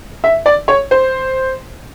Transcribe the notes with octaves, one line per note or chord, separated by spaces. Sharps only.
E5
D5
C#5
C5